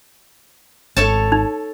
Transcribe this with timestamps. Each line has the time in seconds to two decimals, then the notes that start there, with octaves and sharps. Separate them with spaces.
0.97 G#1 A4 C#5 A5
1.32 D#4